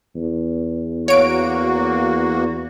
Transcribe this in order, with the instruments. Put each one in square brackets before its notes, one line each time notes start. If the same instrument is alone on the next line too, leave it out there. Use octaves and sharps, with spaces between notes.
[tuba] E2
[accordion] A#3 F#4 [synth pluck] C#5 D7